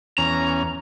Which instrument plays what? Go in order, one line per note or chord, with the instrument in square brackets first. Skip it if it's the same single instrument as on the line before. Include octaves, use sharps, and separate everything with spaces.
[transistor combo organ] E2 C#4 [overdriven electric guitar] A#5